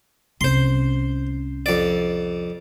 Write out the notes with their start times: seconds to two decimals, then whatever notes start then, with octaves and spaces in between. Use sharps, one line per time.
0.41 C2 C#4 C5 C6
1.66 F2 D5